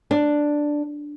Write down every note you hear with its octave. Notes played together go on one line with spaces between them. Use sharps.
D4